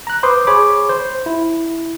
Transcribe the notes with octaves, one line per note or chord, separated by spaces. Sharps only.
A#5 F#6
B4 C5 B5 C6 D6 D#6
G#4 C#5 B5 D6
C5
E4